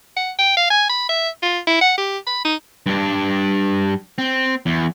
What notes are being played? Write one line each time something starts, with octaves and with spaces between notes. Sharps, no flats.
F#5
G5
F5
G#5
B5
E5
F4
E4
F#5
G4
B5
D#4
G2 D4
C4
E2